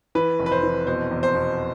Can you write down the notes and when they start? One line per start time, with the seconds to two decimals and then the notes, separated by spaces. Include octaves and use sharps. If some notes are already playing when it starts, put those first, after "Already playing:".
0.15 E3 B4
0.39 F1
0.46 B4
0.52 C5
0.63 E3
0.87 B2 C5
1.11 E2
1.23 C5
1.35 B2